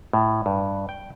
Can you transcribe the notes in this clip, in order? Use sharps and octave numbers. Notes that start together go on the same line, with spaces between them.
A2
G2
G5